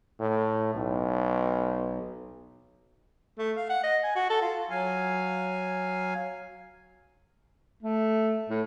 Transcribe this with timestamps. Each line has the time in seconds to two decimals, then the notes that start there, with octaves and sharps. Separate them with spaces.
0.20 A2
0.74 B1
3.39 A3
3.57 F5
3.70 F#5
3.84 D#5
4.04 G#5
4.16 F#4
4.30 A4
4.42 F4
4.70 F#3 F5 G#5
7.83 A3
8.49 A2